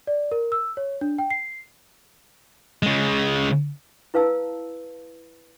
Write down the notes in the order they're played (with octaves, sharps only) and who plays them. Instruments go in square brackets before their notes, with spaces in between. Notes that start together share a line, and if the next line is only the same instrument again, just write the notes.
[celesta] D5
A#4
E6
C#5
D4
G5
C7
[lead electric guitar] C#3 G#3
[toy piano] E4 B4 F5 A5 E6